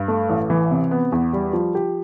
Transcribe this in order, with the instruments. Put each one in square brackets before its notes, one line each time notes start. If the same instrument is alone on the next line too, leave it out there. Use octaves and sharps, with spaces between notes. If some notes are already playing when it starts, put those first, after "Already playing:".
Already playing: [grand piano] G2
A3
A1
E3
C3
B3
E2
G3
F3
G4